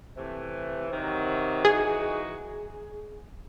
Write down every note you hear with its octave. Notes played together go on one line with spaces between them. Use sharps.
C3 E3 A3
C3 D#3 F#3
E3 G#3 D#4 F#4 G#4